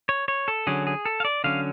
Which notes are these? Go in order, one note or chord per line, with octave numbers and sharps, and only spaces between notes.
C#5
C#5
A4
D3 F#3 C#4 G#4
G#4
A4
F5
D5
D3 F#3 C#4 F5